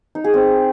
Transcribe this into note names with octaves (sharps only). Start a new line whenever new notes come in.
D#4
G#4
C4